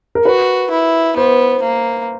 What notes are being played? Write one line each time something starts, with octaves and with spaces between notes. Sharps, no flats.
A#4
F#4 B4
E4
B3 C5
A#3